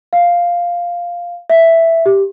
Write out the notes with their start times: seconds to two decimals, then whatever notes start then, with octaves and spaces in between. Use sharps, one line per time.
0.13 F5
1.50 E5
2.06 G4